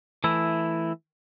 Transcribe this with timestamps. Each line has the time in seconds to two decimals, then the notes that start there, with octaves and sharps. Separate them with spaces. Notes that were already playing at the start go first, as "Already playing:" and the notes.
0.24 E3 A3 E4